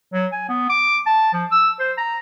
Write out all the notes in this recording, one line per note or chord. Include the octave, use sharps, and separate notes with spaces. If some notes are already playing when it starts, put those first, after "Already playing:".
F#3
G#5
B3
D6
A5
F3
E6
C5
A#5